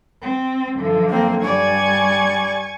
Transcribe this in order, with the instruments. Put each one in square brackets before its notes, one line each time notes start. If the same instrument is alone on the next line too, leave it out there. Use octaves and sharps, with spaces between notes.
[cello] C4
[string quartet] F#2 D3 [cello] F3
[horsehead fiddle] A#3 C4
[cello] G2 [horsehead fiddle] G3 D5 [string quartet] G#5 C#6 G#6